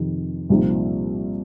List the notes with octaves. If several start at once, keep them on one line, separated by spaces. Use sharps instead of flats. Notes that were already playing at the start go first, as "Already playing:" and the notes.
Already playing: F2 C3 D#3
C2 A#2 F3 C4 D#4